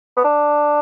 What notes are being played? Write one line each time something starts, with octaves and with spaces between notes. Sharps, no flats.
B3
D4